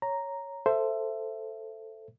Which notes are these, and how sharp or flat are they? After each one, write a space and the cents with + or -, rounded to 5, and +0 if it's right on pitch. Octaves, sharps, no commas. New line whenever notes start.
C#5 +0 A#5 +0
A4 +5 C5 +0 E5 +20